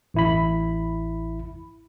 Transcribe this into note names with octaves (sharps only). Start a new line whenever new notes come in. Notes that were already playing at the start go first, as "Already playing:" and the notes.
A1 E4 B5